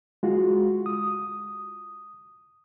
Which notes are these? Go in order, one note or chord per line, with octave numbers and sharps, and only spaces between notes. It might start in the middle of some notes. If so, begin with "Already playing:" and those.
G#3 F4 F#4
D#6